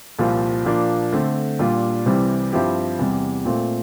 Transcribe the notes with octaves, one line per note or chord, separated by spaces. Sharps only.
C2 A#2 F3 C4 F4
A#2 F3 A#3 D4
D3 A3 C4
A#2 G3 D4 F4
C2 C3 E3 G3 C4
G2 F3 C4 E4 G4
E2 C3 G3
A#2 A3 C4 F4